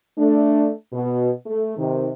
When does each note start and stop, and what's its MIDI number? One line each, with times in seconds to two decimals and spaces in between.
0.18 0.70 57
0.18 0.70 62
0.93 1.29 47
1.46 1.74 57
1.77 2.10 48
1.77 2.10 51